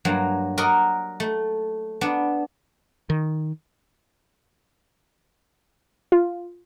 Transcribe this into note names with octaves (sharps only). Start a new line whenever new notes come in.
G2 F#3 A#3
F#4 A#4 D5 D#5
A3
B3 D4
D#3
F4